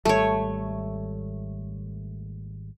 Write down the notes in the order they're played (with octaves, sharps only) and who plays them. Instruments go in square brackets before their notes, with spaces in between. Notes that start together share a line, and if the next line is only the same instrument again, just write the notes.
[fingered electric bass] G#1 G3 [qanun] A3 C#5